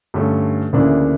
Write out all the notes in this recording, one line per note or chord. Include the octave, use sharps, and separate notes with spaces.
G2 D3 A3 C#4
D2 C#3 E3 A#3 D4